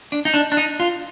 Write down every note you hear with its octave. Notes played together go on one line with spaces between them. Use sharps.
D4
D#4
D4
D4
D#4
F4